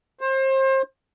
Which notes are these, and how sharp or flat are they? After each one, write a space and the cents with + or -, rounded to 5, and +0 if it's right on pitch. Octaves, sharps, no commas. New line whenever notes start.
C5 +30